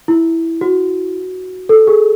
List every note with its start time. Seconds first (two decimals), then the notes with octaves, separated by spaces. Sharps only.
0.08 E4
0.61 F#4
1.69 A4
1.87 G#4